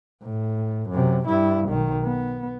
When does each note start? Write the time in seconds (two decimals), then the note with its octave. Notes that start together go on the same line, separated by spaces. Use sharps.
0.23 A2
0.90 F#2 C3
1.28 G2 E4
1.68 B1 D#3
2.04 B3